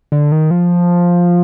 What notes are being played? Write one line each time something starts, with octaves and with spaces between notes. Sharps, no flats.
D3
D#3
F3